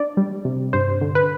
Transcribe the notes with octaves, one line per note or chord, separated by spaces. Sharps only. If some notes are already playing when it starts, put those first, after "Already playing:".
Already playing: D4 D5
G3
C3
G2 C5
D3
B4